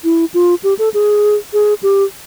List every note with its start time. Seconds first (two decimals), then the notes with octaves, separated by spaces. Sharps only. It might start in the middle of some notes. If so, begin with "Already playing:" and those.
0.04 E4
0.34 F4
0.63 G4
0.79 A4
0.94 G#4
1.53 G#4
1.83 G4